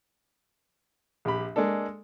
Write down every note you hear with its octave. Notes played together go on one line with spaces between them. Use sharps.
A#1 G4 B5
G#3 A#3 D4 A4